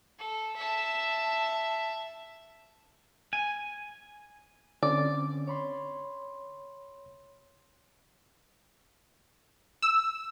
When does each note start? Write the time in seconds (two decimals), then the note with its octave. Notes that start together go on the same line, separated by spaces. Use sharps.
0.19 A4
0.56 E5 A5
3.33 G#5
4.83 D3 C4 C#4 D5
5.48 C#5 B5 C6
9.82 E6